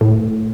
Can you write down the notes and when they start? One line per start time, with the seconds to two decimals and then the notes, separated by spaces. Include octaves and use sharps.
0.01 A2